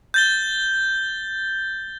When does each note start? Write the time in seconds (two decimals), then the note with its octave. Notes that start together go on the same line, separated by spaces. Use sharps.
0.14 G6 A6 G7